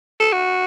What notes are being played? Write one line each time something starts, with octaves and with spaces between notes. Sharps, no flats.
A4
F#4